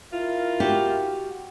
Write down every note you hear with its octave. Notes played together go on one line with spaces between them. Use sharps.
E4 F4 A#4
F#4 G4